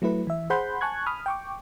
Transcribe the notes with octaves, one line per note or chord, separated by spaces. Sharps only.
F#3 A3 E4 B4
E3 E5
G#4 C5 F#5 B5 C6 G6
G#5 A5 C#6 F#6 G#6
B5 D#6 F6
G5 C#6 D6